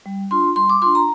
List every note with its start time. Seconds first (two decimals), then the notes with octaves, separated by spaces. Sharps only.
0.06 G3
0.31 D4 F4 C6
0.56 G3 C6
0.70 D6
0.82 D4 F4 C6
0.95 A#5